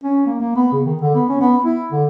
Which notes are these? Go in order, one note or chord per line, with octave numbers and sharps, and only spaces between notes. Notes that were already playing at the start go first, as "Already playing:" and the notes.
C#4
A#3
A#3
B3
C#3
D#3
D3
B3
C#4
B3
E4
D3